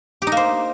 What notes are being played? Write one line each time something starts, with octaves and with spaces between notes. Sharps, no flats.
G4
D#4
A#3
C5